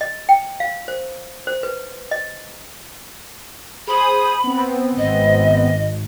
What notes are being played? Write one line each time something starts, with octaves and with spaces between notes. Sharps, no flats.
D#5
G5
F5
C5
C5
B4
D#5
G#4 C5 B5 D#6
B3 C4
G#1 D#5